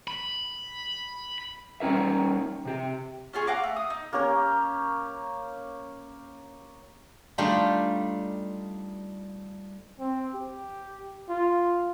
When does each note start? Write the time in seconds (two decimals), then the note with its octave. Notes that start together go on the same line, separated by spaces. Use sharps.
0.08 B5
1.80 G3 C#4 D#4 A#4 E5
2.65 C3 G4
3.33 C#4 F4 G#4 C#6
3.47 F5 F#5 A#5 D6
3.64 A3
3.76 D#6
3.90 D#4
4.13 A#3 C#4 G4 A#4
7.38 G3 A3 D4 D#4 F4 G4
10.00 C4
10.34 G4
11.29 F4